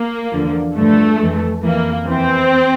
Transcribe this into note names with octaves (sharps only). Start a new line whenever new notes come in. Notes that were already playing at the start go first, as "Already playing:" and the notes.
Already playing: A#3
E2 D3 F3
G2 D3 F3 A3
F2 E3
F2 E3 A#3
E2 E3 C4